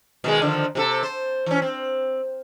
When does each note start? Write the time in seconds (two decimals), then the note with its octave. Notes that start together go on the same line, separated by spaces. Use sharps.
0.24 B2 D#3 G#3
0.42 D3 D#3 F3
0.75 C3 F4 A4
1.03 C5
1.46 E3 C#4
1.62 C4